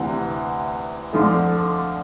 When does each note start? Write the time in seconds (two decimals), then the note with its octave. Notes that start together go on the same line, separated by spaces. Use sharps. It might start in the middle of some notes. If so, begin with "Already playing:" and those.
Already playing: D2 C3 E3
1.13 D2 D3 F3 A3